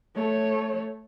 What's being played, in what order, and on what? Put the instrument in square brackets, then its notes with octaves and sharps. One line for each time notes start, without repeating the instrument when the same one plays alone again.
[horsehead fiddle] A3 C#5